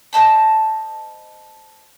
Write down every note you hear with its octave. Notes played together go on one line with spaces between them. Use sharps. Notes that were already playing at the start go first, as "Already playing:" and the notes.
C5 D#5 A5 B5